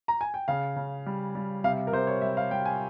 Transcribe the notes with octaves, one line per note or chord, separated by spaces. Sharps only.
A#5
G#5
G5
C#3 F5
C#3
G3
G3
C3 F5
A#4
C3 C5
C#5
G3 E5
F5
G3 G5
G#5